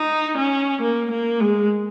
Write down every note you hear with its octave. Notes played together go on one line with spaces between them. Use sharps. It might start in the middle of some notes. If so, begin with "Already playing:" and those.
Already playing: D#4
C#4
A#3
A#3
G#3